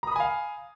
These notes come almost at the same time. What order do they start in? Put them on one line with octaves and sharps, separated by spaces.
A#5 D#6 B5 G#5 F5